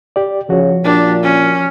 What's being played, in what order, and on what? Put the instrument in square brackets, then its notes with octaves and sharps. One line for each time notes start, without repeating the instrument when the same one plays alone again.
[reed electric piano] G4 D5
[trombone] C#3 [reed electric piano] F3 F#4
[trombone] A#2 [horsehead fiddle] D4 G4
[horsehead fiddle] C#4